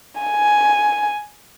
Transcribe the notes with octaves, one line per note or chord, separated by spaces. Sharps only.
G#5